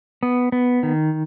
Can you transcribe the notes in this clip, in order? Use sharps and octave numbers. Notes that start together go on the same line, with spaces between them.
B3
B3
D#3